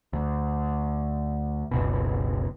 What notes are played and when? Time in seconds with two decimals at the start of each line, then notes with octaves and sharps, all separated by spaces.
0.13 D2
1.71 F#1 C#2 B2